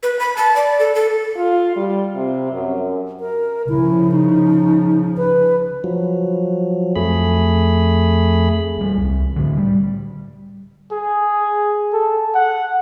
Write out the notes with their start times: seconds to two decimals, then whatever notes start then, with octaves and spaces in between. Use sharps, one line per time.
0.03 B4
0.19 B5
0.37 A5
0.56 D5
0.79 A4
0.95 A4
1.37 F4
1.76 G3
2.16 C3
2.53 F#2
3.20 A#4
3.69 C#3 F3 E4
4.12 D#4
5.17 B4
5.84 F3 F#3
6.96 F2 A3 G#4 B5
8.78 D#1 G3
8.98 C2
9.36 A2 D3
9.57 G3
10.91 G#4
11.93 A4
12.34 F#5